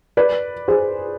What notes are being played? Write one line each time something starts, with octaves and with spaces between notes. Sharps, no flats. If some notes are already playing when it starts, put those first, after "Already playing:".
B4 D5
G#4 C5